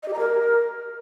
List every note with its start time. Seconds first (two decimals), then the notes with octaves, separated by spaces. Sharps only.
0.03 D#5
0.08 G4
0.13 A#5
0.19 A#4